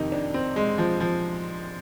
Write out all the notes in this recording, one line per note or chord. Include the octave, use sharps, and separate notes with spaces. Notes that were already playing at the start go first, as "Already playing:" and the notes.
Already playing: F2 C3 D#3 D#4
D4
C4
G#3
F3
F3